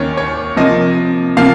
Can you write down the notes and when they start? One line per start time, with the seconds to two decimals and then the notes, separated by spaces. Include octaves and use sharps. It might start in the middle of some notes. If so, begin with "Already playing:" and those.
Already playing: D#2 D#3 A#3 C#4 C#5
0.17 C#5
0.57 C3 F3 A#3 D#5
1.37 C3 F3 A#3 F5